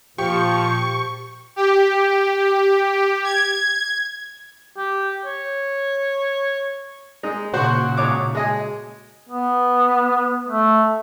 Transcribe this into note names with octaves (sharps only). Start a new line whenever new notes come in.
A#2 F3 G4 C#6
G4
G#6
G4
C#5
G#3 D#4
A#2 C#3 F#4 C5 C#6
G#2 C#5 D6
G#3 D#5 G#5
B3
A3